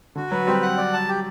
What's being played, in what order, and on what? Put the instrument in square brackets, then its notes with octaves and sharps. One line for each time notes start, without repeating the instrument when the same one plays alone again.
[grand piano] D3 [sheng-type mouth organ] F#4
[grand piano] F#3 [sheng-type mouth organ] B4
[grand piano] G3 [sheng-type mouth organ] C4
[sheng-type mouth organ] F#5
D5
A5
G4